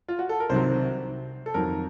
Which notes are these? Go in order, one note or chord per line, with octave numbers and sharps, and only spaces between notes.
F4
F#4
A4
A#4
C2 C3 D#3 F#3 C5
A4
F2 D#3 F#3 A#4